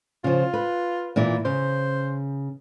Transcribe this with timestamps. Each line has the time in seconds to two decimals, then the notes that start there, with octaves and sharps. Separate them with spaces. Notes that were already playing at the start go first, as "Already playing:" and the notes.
0.24 C#3 F3 F4
0.54 B4
1.16 A#2 E3 E4
1.45 C#3 C5